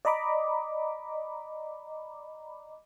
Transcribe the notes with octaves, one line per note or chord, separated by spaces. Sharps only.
D5 D#5 A#5 B5 D6